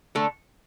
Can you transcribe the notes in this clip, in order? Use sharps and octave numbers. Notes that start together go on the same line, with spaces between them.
D3 A3 A4